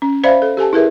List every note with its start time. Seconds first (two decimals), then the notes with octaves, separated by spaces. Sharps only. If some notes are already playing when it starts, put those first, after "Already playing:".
0.02 C#4
0.24 C5 D5 E5 F5 B5
0.42 A4
0.57 G4 A4 G#5 A5
0.73 E4 G#4 A#4 B4 E5